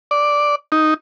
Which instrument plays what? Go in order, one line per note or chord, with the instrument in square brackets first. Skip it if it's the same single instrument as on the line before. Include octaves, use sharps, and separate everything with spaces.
[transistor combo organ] D5
D#4